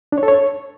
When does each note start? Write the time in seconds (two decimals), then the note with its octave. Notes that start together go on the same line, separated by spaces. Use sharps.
0.12 D4
0.18 C#5
0.23 A4
0.28 C#5